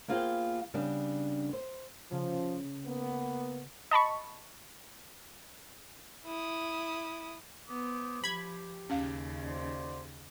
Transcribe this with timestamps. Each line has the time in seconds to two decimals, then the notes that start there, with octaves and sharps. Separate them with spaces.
0.08 A#3 B3 F4 G#4 C5 G5
0.74 C#3 G3 B3 D4
1.53 C5
2.12 C#3 F3
2.86 A#3 B3
3.91 D#5 A5 B5 C#6
6.25 E4 D#6
7.69 B3 C5 D6 D#6
8.24 F3 G4 B5 G#6
8.90 D#2 C#3 C#4 F5
9.45 F#4 C5 D5